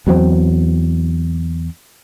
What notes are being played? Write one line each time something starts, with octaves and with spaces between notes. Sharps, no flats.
E2 F#3 A3 C4